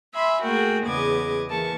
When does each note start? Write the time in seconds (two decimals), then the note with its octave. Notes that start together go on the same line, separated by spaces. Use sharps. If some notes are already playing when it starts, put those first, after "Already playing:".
0.14 E5 G#5 B5 C6
0.42 A3 A#3 F#4 G#4 A#4 G5
0.83 E2 C#3 B3 D#5 D6 G#6
1.47 E3 A#3 A5 C#6